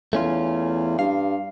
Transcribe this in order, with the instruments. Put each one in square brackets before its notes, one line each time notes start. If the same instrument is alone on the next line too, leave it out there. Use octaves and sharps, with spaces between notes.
[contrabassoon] E2 [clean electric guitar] A3 C#4 F4
[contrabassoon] G2 [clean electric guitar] F5